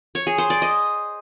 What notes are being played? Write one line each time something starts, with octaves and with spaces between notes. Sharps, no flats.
C#5
G#4
C5
D5
D#5